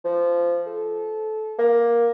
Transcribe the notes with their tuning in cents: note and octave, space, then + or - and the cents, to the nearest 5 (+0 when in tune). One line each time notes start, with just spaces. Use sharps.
F3 -15
A4 -20
A#3 +10